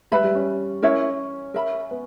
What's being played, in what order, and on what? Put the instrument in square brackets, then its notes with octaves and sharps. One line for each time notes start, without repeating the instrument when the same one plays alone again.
[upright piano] G3 [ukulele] B4 E5 B5
[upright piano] G3
C#4
[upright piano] C#4 [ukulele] E4 A#4 C#5 E5
[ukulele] A#4 E5 B5
[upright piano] B3